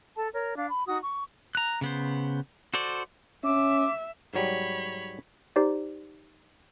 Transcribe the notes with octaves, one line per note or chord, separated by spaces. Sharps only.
A4 A5
A#4 C#5
D4 F5
B5
D#4 F#4 D#6
C#6
A#5 F#6
C#3 B3 C5
F#4 A4 C5 D5
C#4 E5 D6
G#2 F#3 G3 C#5 B5
D#4 G4 C5 D5